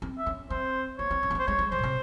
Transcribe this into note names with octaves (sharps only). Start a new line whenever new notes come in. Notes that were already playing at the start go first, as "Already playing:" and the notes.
C4
E5
C#4
C4 C5
A#3 C#5
C4
C#4
A#3
C4
C5
G#3 C#5
G#3
E3 C5
C#3
C3